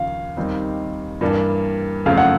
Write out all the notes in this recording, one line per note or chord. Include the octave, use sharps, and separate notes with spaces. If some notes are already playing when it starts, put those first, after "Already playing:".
Already playing: D#2 C#3 F3 F5
D#2 D#3 G3 C4 D#4
G2 E3 G3 A#3 D4
F#2 C#3 F3 A3 C4 F5
F#5